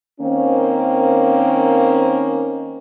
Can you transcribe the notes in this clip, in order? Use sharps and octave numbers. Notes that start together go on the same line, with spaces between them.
D#3 A#3 C4 C#4